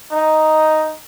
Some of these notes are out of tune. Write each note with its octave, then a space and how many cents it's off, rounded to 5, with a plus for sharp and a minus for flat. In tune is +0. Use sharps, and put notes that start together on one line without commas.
D#4 +0 D#5 +0